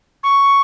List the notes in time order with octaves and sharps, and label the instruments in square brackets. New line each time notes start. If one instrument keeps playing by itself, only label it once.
[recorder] C#6